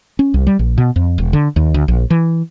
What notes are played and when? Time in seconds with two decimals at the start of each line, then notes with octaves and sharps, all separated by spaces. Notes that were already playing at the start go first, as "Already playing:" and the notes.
0.19 C#4
0.34 C2
0.47 G3
0.59 A#1
0.78 B2
0.96 F2
1.18 E1
1.33 D3
1.56 D#2
1.74 D2
1.88 A#1
2.10 E3